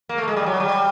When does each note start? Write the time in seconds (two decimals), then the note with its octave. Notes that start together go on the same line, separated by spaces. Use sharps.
0.09 A#3
0.18 A3
0.28 G#3
0.36 G3
0.46 F#3
0.60 G3